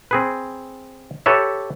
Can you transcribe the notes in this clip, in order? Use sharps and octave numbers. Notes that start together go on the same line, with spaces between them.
C4 G#4 B4
G4 A4 B4 C#5 E5